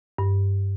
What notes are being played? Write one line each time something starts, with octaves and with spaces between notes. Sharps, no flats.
G2